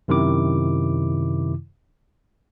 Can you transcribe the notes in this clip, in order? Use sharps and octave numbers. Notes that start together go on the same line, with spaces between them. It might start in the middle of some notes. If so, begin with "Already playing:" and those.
F#2 C3 D#3 E4 D6